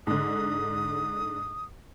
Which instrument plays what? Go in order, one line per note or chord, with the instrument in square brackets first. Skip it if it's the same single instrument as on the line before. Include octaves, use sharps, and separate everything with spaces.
[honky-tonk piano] G#2 D3 [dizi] D#6